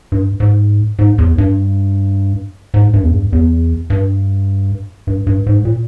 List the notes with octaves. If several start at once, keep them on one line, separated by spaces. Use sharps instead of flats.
G2
G#2
G#2
E2
G2
G#2
G2
E2
G2
E2
G2
G2
G2
G#2
A#2